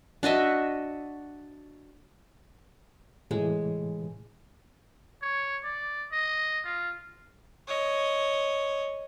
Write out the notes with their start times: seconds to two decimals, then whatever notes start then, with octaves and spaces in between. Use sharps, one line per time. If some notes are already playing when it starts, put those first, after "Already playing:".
0.23 D4 F#4 D#5 E5
3.31 A2 C3 E3 G#3
5.22 C#5
5.64 D5
6.12 D#5
6.65 F4
7.68 C#5 D#5